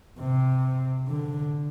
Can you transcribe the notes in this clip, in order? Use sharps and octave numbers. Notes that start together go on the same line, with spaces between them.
C3
D3